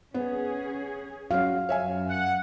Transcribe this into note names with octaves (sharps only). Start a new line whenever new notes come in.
B3 C#4 G#4
F#3 C#4 F5
F#2 C#5 E5 G#5
F#5